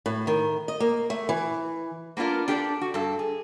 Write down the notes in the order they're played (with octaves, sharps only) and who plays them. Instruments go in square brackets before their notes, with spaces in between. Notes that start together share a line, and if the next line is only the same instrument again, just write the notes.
[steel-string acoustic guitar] A2
D#3
D#5
A#3
A3
E3
[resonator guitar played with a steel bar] A#3 B3 D4 F4 A#4
D4 G4 A4 C#5 D5
F#4
G2 A4
G#4